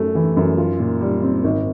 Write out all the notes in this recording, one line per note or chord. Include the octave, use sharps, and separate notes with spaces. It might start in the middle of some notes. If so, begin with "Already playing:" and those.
Already playing: F#2 A3
E3
F#2
F4
A#2
G3
C4
G#1